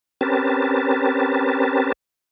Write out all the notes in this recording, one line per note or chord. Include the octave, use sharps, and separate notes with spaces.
C4 C#4 G4 A#4 B4 A5